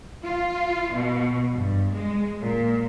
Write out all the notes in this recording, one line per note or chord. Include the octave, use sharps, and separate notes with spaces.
F4
B2
G2
G#3
A#2